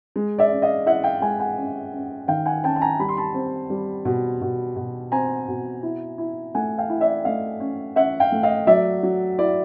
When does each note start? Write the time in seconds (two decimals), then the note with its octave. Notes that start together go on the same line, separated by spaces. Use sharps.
0.16 G#3
0.39 D5 E5
0.51 C#4
0.62 D#5 F5
0.86 E4 E5 F#5
1.04 F5 G5
1.21 G#3 F#5 G#5
1.39 F#5 G#5
1.57 C#4
1.93 C#4
2.28 D#3 F5 G5
2.46 F#5 G#5
2.64 C#4 G5 A5
2.76 A5
2.81 G#5 A#5
2.99 G3 B5
3.09 C6
3.17 A5 B5
3.34 C4
3.70 G3
4.05 B2
4.41 B2
4.76 B2
5.12 C4 G#5 A#5
5.48 B2
5.83 E4
6.18 E4
6.55 A3 F#5 G#5
6.78 F5 G5
6.90 E4
7.01 D5 E5
7.25 A3 D#5 F5
7.60 C#4
7.96 C#4 E5 F#5
8.20 F5 G5
8.32 A3
8.43 D#5 F5
8.67 F#3 D5 E5
9.03 F#3
9.38 E4 D5